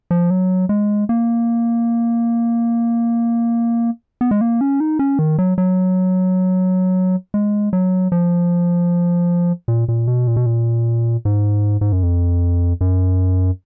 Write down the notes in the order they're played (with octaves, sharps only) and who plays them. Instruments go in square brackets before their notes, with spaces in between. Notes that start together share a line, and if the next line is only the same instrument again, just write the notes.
[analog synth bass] F3
F#3
G#3
A#3
B3
G#3
A#3
C#4
D#4
C#4
D#3
F#3
F#3
G#3
F#3
F3
A#2
A#2
B2
A#2
B2
A#2
G#2
G#2
F#2
F2
F#2